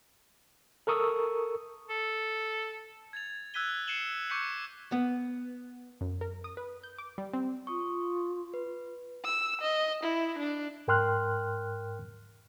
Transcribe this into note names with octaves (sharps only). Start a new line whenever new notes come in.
A4 A#4 C#6 D#6 E6
A4
G#6 A6 F7
E6 F#6 G#6 B6 D#7 G7
C7 C#7 D#7 E7 F#7 G7
C#6 D6 G6 B6 C#7 F#7
B3
F#2
A#4
D#6
B4
G6
D6
G3
C4
F4 C#6 D#6
B4
E6
D#5
E4
D4
G#2 A#4 G5 C6 F6 F#6